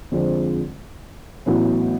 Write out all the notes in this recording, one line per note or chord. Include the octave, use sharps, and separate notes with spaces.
F2 D3 F3 G#3 C4
A1 A2 F#3 B3 E4